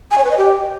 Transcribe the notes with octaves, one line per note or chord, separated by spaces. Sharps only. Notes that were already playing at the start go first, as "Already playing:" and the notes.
G#5
C#5
B4
D#5
G4